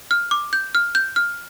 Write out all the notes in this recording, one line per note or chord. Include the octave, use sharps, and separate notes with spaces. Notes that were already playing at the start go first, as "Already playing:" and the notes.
F6
D6
G6
F6
G6
F6